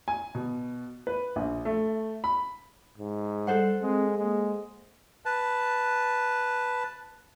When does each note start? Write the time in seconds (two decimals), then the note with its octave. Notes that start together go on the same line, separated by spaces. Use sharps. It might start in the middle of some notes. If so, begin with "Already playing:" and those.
0.08 G#5
0.35 B2
1.07 B4
1.36 A#1
1.65 A3
2.24 B5
2.98 G#2
3.47 G3 A4 C5 F#5
3.82 G#3 C4
4.18 G#3 A#3
5.26 B4 A5